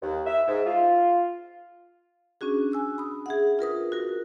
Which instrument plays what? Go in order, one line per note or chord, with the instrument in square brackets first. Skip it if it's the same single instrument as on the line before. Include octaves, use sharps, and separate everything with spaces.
[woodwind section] D#2
E5
G#2
F4
[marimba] C#4 D4 F#4 G#4
G#5 E6 F#6
B5 D#6
G#4 E5 F#5
F4 A#4 B4 D#6
F#4 A#4